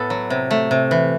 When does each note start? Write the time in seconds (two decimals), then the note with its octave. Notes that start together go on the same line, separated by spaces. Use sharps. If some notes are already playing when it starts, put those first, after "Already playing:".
Already playing: A2 B3 A4 B4
0.10 F#3
0.30 C3
0.51 A3
0.71 C3
0.91 E3